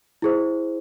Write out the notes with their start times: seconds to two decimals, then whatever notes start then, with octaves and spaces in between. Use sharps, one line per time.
0.22 E4 G#4 C5